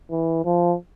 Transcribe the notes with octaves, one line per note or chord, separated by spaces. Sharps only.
E3
F3